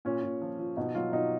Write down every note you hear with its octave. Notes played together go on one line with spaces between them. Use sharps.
A#2 C#4
A#2
F3
F3
B2 D#4
F#3 F4
B2 D#4